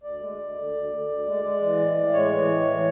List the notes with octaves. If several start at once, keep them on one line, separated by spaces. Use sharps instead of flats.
D2 D5
G#3
D2
D3
D2
D3
D2
G#3
G#3 D5
E3
A2
A2
G#3 C#5
E3
A2
E3